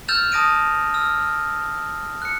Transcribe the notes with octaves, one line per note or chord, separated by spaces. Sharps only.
E6 F6 G6 A6 E7 F7
A5 D#6 A#6 D7 D#7
E6 F6
F#6 C#7